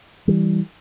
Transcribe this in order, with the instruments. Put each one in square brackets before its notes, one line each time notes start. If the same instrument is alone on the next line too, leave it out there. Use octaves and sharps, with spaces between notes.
[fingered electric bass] E3 G3